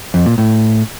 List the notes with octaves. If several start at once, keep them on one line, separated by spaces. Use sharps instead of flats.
F2
A#2
A2